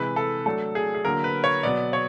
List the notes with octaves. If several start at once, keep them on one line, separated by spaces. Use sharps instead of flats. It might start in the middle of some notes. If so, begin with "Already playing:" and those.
Already playing: C3 E3 G#3 B4
A4
F#3 A3 D4 A4
G#4
G#4
D3 F#3 A#3 A#4
B4
C#5
B2 F#3 B3 D5
C#5